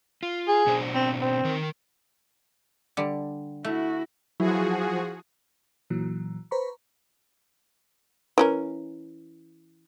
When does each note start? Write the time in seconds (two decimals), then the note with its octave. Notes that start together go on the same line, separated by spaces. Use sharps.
0.23 F4
0.48 G#4
0.67 B2 D4 C5
0.94 C4
1.21 C4
1.44 D#3 A#4
2.97 D3 G3
3.65 A3 E4 F#4
4.40 F3 F#3 E4 F#4 G#4
5.90 A#2 E3 F#3
6.51 B4 C5 A#5 B5 C#6
8.38 E3 C#4 A#4